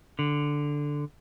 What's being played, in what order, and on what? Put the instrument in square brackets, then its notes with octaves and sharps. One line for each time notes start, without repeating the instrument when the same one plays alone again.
[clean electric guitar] D3